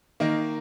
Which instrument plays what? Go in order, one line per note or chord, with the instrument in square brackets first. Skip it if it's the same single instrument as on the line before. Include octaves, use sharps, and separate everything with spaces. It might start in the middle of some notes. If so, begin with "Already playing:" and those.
[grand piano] D#3 A#3 D#4